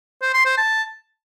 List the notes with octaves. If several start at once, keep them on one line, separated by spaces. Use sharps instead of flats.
C5
C6
C5
A5